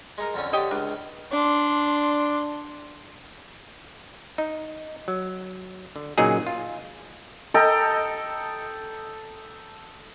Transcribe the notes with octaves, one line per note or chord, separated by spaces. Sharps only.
G#3 D#4 A#4
F2 D3 C#4
D3 G4 C#5 D#5 G5
C#2 D4
D4 C6
D#4
F#3
D3
A#2 C#3 F#3 D#4 G#4
F4
A4 D#5 G5 A#5